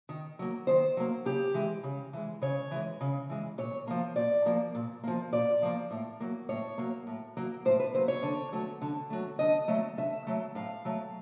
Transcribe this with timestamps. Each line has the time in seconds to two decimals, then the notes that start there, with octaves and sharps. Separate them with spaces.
0.09 D#3
0.39 F#3 A#3
0.67 D#3 C5
0.97 F#3 A#3
1.25 C#3 G4
1.54 E3 G#3
1.84 C#3
2.13 E3 G#3
2.42 C#3 C#5
2.71 E3 G#3
3.01 C#3
3.29 E3 G#3
3.58 A#2 C#5
3.87 F3 A#3
4.16 A#2 D5
4.46 F3 A#3
4.75 A#2
5.03 F3 A#3
5.33 A#2 D5
5.62 F3 A#3
5.91 A2
6.20 F#3 A#3
6.49 A2 C#5
6.78 F#3 A#3
7.07 A2
7.37 F#3 A#3
7.65 A2 C5
7.80 B4
7.94 F#3 A#3 C5
8.08 C#5
8.23 D3
8.52 F#3 A3
8.82 D3
9.10 F#3 A3
9.39 D3 D#5
9.68 F#3 A3
9.97 D3 E5
10.27 F#3 A3
10.55 A2 F5
10.85 F#3 A3